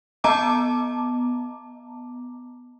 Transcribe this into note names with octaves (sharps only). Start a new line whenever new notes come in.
B3 D#5 A5 A#5 D6